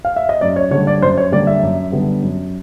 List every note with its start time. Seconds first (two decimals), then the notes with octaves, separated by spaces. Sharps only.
0.05 F5
0.16 E5
0.29 D#5
0.41 F#2 D5
0.56 C#5
0.71 D3 C#5
0.74 G3 A#3
0.87 D5
1.01 F#2 C5
1.18 C#5
1.32 D3 G3 A#3 D5
1.47 E5
1.63 F#2
1.92 D3 G3 B3
2.22 F#2